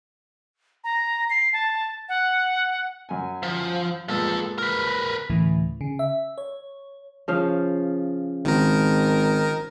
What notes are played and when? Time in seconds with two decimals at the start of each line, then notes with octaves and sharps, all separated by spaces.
0.84 A#5
1.30 C7
1.53 A5
2.09 F#5
3.09 F#2 G#5
3.43 F3
4.08 A#2 F3 G#3 B3 A4
4.58 A#4 B4
5.30 D2 A2 C#3 E3
5.81 C#3
5.99 E5
6.38 C#5
7.28 C#3 F3 F5
8.45 G#1 D#3 A#4